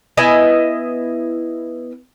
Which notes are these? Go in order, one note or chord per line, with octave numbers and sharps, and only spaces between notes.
B3 E4 D#5 G#5